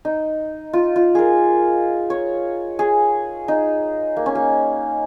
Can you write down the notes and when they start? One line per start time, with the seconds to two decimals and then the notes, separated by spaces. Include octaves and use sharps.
0.05 D#4
0.73 F4
0.96 F4
1.15 G#4 A#4
2.10 C#5
2.79 G#4
3.48 D#4
4.17 A#3
4.26 C#4
4.35 A#3